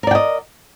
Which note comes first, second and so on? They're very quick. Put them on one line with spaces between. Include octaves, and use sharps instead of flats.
A#4 D5 G5 D#5